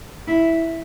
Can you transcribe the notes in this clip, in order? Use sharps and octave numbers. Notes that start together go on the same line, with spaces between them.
E4